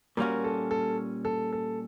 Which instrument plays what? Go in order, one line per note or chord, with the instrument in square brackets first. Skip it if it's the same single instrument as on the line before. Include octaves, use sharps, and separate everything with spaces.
[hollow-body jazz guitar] A#2 G3 A#3 C#4 F#4 [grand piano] A#4
[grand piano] A4
A4
A4
A4